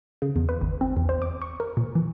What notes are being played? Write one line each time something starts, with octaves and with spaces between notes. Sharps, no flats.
C#3
E2
B4
G#1
C4
E2
C5
D6
C#6
A#4
A#2
E3